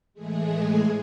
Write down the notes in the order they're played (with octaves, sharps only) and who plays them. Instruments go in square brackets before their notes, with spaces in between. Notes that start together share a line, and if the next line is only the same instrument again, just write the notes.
[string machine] A2 E3 G#3 A3 G#4